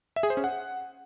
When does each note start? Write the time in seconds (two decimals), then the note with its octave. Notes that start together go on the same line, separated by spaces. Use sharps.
0.16 E5
0.23 G#4
0.30 C5
0.37 C#4
0.44 F#5